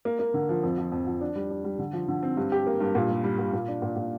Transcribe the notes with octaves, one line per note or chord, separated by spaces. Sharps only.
A#3
A#3
D3
F3
F2
F3
F2
F3
D4
G3
D4
G3
D3
F3
D3
C4
G2
G4
A#3
G2
A#2
G3
G3
A#2
A#2
D4
A#2
A#2